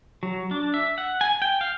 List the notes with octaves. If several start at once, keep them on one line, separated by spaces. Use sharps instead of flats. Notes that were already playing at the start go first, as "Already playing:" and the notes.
F#3
D4
E5
F#5
G#5
G5
F5